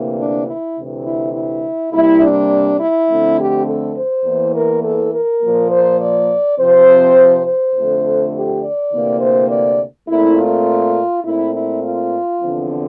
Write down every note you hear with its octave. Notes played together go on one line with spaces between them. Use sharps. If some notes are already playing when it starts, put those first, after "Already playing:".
Already playing: D2 C3 E3 A#3
D4
E4
D2 C3 E3
E4
E4
C3 G3 A#3 E4
D4
E4
F2 D3 A3 C4
G4
A4
C5
E2 E3 A#3
A#4
A4
A#4
A#2 F3 A#3
C5
D5
C3 F3 C4 C5
C5
F2 D3 F3 A3
G4
D5
D2 C3 E3 A#3
C5
D5
A#2 A3 C4 E4
F4
A#2 A3 C4 E4
E4
F4
E2 D3 F3 C4